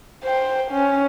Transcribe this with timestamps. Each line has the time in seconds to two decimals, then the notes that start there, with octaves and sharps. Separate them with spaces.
0.24 C5 G5
0.71 C#4